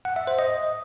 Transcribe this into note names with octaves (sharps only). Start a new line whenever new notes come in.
F#5
E5
C5
D#5